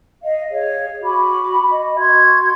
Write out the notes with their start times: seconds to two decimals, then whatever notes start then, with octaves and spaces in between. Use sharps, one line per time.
0.22 D#5 F5
0.51 G#4 C#5 F5
1.03 F#4 B5 D6
1.70 D#5
1.97 F#4 C6 G#6